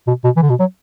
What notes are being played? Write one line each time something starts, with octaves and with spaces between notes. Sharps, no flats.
B2
B2
E3
D3
B2
F#3